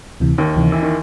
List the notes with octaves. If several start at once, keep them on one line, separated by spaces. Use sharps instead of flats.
D2 C3 E3
D#2 D#3
D2 C3 E3
E3
D#3